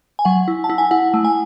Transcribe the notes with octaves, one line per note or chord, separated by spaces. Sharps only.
G#5
F#3 F#5
E4
A5
E4
G#5
E4 F#5
A3
G#5